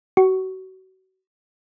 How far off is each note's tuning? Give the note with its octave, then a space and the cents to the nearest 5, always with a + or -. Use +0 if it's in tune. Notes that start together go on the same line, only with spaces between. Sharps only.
F#4 +30 C#6 +5